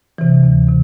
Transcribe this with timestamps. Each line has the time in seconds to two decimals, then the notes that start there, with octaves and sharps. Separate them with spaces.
0.18 C3 E3
0.43 D2
0.68 C3